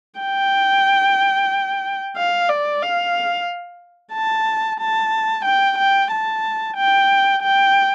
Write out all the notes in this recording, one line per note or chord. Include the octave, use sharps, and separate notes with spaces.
G5
F5
D5
F5
A5
A5
G5
G5
A5
G5
G5